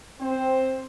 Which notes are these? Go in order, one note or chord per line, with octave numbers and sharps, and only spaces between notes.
C4 C5